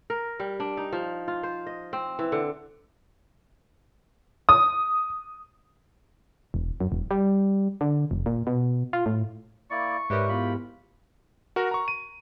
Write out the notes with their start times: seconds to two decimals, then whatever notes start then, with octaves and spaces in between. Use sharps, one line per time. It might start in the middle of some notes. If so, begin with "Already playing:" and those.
0.10 A#4
0.40 G3
0.60 D4
0.77 D#4
0.93 F3
1.28 F4
1.43 C5
1.67 D#5
1.93 C4
2.19 E3
2.32 D3
4.49 D#6
6.54 E1
6.80 F#2
6.92 E1
7.11 G3
7.81 D3
8.11 F1
8.26 A#2
8.47 B2
8.93 F4
9.06 A2
9.71 A#3 E4 D5 C#6
10.10 G#2 G4 A#4 B4 C#5 D5 E5
10.29 B3 E4 F4 B5
11.56 F#4 A#4
11.71 A#5 C#6
11.88 D#7